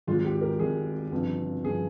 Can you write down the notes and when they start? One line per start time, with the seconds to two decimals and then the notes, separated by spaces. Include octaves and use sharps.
0.07 G#1 G#2 D#3 G#3 F4
0.25 G4
0.41 A#4
0.59 G#1 G#2 D#3 G#3 G#4
1.11 G1 F2 C#3 F3
1.64 G1 C#3 F3 G#4